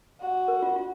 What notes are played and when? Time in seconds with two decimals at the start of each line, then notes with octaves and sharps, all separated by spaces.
0.20 F#4
0.48 A#4
0.63 F4
0.76 F4